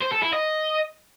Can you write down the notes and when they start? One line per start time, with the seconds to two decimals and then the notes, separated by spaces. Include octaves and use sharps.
0.02 C5
0.13 A4
0.23 E4
0.33 D#5